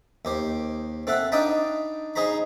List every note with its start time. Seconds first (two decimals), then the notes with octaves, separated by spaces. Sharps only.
0.25 D#2 G4 C5
1.07 C4 A4 E5 F#5
1.32 D4 D#4 D#5 G5 A5 B5
2.16 D#4 G#4 C5 A#5 B5